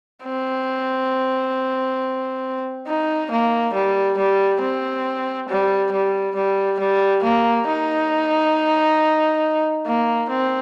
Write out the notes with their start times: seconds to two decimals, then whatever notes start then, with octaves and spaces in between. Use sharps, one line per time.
0.24 C4
2.87 D#4
3.31 A#3
3.74 G3
4.18 G3
4.61 C4
5.49 G3
5.92 G3
6.36 G3
6.80 G3
7.24 A#3
7.67 D#4
9.86 A#3
10.29 C4